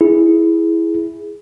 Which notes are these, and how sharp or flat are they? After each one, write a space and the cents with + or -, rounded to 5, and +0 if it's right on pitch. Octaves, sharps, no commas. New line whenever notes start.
E4 +0 G#4 +0